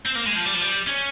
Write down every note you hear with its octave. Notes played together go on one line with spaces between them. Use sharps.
C4
A#3
G#3
F3
G3
F3
G3
C#4